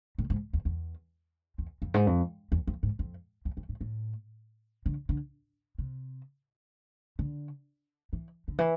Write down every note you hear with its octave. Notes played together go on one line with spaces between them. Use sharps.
A2
G#2
E2
E2
E2
F2
G#2
F2
E2
F2
G#2
F2
E2
F2
G#2
A2
D3
D3
C3
D3
E3
D3
E3